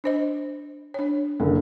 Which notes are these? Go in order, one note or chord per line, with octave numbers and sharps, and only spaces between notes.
D4 C5 D#5
D4 C#5
F#1 D3